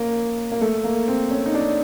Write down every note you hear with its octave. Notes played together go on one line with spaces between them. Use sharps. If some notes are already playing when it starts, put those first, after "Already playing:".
Already playing: A#3 C#4
A#3
A3
A#3
C4
C#4
D#4
D4